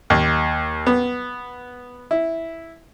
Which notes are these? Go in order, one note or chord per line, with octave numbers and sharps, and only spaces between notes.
D#2
B3
E4